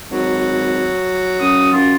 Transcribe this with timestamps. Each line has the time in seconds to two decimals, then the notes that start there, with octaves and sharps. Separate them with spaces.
0.10 G#1 F#3
1.40 F#2 D#6
1.72 F#2 F4